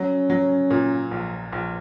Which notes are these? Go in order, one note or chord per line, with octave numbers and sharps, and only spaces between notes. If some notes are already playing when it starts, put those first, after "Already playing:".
Already playing: F#3 C#4
F#3
A#2
A#1
A#1